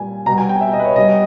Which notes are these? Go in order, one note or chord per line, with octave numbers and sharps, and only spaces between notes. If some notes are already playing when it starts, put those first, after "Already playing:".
Already playing: A#2 G3 G#5
B2 G3 A#5
G#5
G5
E5
D#5
B4
C#5
B2 G3 D#5